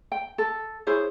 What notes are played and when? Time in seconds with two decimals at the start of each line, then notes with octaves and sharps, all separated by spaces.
0.12 G5
0.38 A4
0.87 E4 G#4 C5 C#5